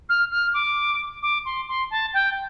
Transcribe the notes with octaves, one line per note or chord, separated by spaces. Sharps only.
F6
F6
D6
D6
C6
C6
A5
G5